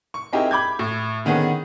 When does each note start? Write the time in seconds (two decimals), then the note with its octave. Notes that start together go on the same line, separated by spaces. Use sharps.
0.14 C#6
0.33 C4 D#4 E4 G4 G#4 A#4
0.51 B5 D6 G6 G#6
0.79 A2
1.25 D3 D#3 B3 C#4 G#4